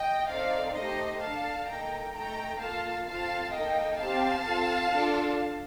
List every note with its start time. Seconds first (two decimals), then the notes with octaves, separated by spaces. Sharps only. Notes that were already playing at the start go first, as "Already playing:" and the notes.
Already playing: D#5 G5
0.28 C4 D#4 A4 D5 F5
0.75 A3 D#4 G4 C5 D#5
1.21 D4 A4 F5 A5
1.67 A#3 D#4 A4 G5 A#5
2.14 A3 D#4 A4 G5 A#5
2.60 A#3 F4 A4 F5 A5
3.06 C4 F4 A4 F5 A5
3.52 A#3 D#4 A4 D#5 G5
3.99 C4 G4 F5 A5
4.45 C4 F4 A4
4.92 D4 F4 A4